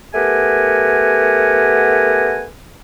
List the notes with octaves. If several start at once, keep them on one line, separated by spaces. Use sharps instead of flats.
A3 B3 G4 A#4 F#5 G#5